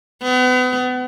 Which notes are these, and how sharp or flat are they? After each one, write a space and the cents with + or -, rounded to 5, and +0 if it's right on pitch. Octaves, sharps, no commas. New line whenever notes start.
B3 +35